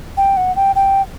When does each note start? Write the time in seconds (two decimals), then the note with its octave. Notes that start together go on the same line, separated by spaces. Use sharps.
0.17 G5
0.37 F#5
0.56 G5
0.75 G5